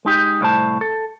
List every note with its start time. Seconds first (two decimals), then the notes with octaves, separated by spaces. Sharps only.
0.05 G#3 D#4 G4
0.41 C2 A2 C5 A5
0.81 A4